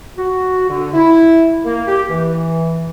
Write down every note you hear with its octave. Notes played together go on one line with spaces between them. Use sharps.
F#4
D3
E4
A#3
G4
E3